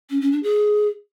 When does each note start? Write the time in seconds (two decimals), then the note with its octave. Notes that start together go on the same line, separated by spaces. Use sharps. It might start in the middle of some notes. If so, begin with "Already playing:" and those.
0.10 C#4
0.21 C#4
0.32 D4
0.43 G#4